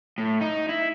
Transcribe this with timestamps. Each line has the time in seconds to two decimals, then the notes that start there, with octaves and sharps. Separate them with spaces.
0.18 A2
0.41 D#4
0.69 E4